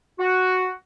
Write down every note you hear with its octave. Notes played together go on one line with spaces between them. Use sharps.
F#4